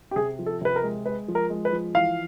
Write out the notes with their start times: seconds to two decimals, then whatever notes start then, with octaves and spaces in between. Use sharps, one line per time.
0.11 G4
0.16 C3 G#4
0.39 F3
0.46 A4
0.61 C3 B4
0.76 A#4
0.83 G#3
1.05 G#3 B4
1.28 F3
1.35 A#4
1.50 G#3
1.65 B4
1.72 F3
1.95 E3 F5